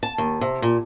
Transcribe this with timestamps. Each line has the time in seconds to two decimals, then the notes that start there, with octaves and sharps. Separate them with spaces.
0.03 A5
0.18 D#2
0.41 C3
0.62 A#2